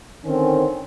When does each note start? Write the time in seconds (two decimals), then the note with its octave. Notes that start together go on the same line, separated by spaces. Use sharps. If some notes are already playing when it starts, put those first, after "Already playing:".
0.25 D3 D#3 C4 C#4